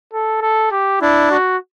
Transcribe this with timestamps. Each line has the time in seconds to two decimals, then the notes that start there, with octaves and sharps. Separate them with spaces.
0.13 A4
0.42 A4
0.71 G4
1.01 D4 E4
1.31 F#4